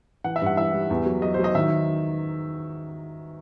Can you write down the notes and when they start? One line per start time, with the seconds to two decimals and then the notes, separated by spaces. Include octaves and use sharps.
0.24 E3 F#5
0.36 E5
0.42 G2 F#5
0.57 E3 E5
0.73 G3
0.90 E2
1.06 F#3
1.22 F#3 D#5
1.34 C5
1.39 F#3 D#5
1.55 D#3 E5